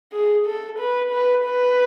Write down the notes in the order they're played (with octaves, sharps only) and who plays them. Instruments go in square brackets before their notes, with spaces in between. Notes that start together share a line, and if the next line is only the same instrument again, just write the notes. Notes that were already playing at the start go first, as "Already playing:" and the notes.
[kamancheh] G#4
A4
B4
B4
B4